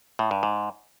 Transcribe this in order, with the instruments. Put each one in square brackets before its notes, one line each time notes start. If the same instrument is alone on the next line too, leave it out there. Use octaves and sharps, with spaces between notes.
[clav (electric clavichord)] A2
G2
G#2